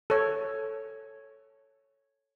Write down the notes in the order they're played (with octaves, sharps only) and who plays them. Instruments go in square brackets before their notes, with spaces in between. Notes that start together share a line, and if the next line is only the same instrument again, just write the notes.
[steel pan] A4 C#5